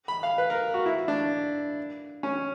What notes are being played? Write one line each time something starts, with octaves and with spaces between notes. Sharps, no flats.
B5
F5
B4
A#4
F#4
E4
D4
C#4